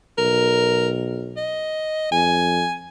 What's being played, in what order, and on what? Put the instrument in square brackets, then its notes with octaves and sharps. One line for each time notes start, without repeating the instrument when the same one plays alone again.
[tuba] B1 [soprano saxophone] A#4
[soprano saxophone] D#5
[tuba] F2 [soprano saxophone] G#5